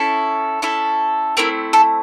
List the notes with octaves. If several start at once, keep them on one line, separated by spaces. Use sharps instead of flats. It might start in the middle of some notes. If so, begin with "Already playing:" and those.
Already playing: C#4 E4 A4
C#4 E4 A4
A3 C4 E4 A#4
A4